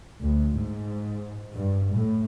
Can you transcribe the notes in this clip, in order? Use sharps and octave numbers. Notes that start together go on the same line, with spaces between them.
D2
G#2
G2
A2